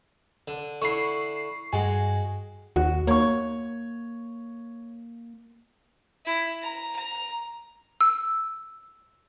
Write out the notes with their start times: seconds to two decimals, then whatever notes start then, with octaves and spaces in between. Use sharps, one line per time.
0.48 D3
0.82 D3 E4 C#6 C7
1.73 G2 G#3 F#4 G#5
2.76 D#2 F#4
3.07 A#3 C#5 C#6
6.26 E4
6.62 A#5
6.96 A#5
8.01 E6